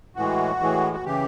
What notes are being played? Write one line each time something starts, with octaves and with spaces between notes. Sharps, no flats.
A2 E3 G#3 F#4
A2 E3 G#3
F#4
C#3 E3 G4